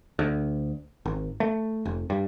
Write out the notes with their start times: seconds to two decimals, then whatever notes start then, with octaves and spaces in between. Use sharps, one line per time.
0.19 D2
1.06 G#1
1.40 A3
1.85 F1
2.10 G2